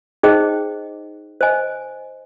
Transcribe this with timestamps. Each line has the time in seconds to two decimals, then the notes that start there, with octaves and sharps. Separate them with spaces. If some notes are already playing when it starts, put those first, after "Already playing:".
0.23 D#4 G#4 C5 D#5 G5
1.41 C5 D#5 G#5